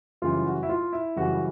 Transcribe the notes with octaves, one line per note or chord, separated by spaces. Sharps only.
F#2 C#3 E3 G3 F4
F#4
E4
F4
E4
F#2 C#3 E3 G3 F#4